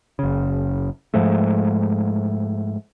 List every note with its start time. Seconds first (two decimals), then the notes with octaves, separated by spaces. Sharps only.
0.19 F#1 C#3
1.14 G#2 F3 G#3 A3